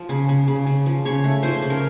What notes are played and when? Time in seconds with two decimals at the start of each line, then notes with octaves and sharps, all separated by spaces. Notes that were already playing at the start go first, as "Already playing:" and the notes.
Already playing: F3
0.09 C#3
0.29 C#3
0.48 C#3
0.66 C#3
0.86 F3
1.05 C#3 C#5
1.24 A3
1.43 F3 C5
1.62 C#3
1.70 A#4